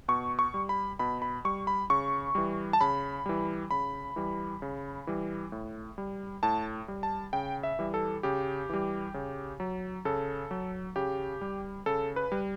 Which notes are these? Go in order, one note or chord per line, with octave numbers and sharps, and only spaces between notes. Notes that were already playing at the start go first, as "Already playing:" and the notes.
B2 C#6
C#6
G3
B5
B2 B5
B5
G3 C#6
B5
C#3 C#6
E3 G3
A5
C#3 B5
E3 G3
C#3 B5
E3 G3
C#3
E3 G3
A2
G3
A2 A5
G3
A5
C#3 G5
E5
E3 G3
A4
C#3 G4
E3 G3
C#3
F#3
C#3 A4
F#3
C#3 G4
G3
C#3 A4
B4
G3